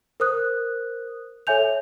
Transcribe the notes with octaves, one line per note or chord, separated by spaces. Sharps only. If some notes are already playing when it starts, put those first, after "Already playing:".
A#4 C5 D#6 F#6
A4 C#5 E5 G#5 G6 F7